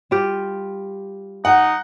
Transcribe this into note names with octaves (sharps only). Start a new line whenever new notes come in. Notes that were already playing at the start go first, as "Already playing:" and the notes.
G3 F4 G4
D#4 F#5